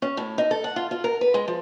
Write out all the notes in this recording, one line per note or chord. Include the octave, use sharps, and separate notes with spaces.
C#4
A2
D#4
A4
F#5
F4
F4
A#4
B4
G#3
F3